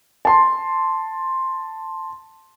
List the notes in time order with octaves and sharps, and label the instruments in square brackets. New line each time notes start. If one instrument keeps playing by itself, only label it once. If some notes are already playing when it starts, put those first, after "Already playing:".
[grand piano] A5 C6